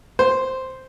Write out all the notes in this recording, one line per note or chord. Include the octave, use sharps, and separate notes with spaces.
C5